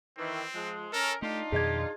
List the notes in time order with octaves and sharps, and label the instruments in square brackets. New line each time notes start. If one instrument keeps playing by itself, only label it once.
[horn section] D#3 E3 [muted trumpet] C4
[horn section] F3 G#3
[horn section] C#4 A#4 [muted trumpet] A4
[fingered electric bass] A3 [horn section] D4 D#4 F4 [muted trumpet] G4
[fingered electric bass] F2 B2 D#3 [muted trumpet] G4 [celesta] G#4 D#5 G#6